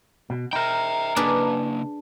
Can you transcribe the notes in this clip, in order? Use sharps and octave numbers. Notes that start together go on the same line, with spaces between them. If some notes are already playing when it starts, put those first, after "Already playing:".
B2
D#4 A#4 E5 G5
C#3 A#3 D4 G#4 B4